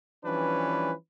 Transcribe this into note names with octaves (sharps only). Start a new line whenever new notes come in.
E3 F3 G3 C#4 D4 B4